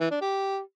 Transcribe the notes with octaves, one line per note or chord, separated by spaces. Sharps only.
E3
D4
G4